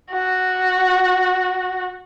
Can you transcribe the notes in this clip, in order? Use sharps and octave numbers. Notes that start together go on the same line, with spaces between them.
F#4